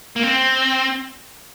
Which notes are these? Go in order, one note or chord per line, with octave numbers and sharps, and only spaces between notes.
A#3
C4